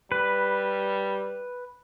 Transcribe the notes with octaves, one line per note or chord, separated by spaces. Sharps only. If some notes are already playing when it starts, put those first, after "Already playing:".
G3 B4